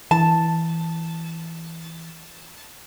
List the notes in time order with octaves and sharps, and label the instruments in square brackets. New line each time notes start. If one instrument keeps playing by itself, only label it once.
[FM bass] E3 [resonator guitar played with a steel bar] A5